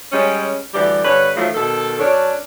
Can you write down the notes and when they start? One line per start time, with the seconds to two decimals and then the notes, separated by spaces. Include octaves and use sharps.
0.12 G3 G#3 C#4
0.73 D2 E3 G3 G4 D5
1.04 G2 D3 B4 C#5
1.36 D#3 F3 F#3 A3
1.54 B2 D#3 A4
2.00 F#2 D4 C#5